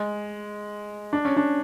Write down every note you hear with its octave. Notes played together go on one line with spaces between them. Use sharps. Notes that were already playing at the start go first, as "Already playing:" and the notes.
Already playing: G#3
D4
C#4
D4